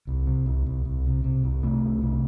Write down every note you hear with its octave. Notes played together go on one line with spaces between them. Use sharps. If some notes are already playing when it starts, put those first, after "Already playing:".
C2
C3
C2
C2
C2
C3
C3
C2
C3 A3
C2
C3